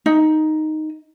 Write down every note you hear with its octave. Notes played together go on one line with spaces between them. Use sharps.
D#4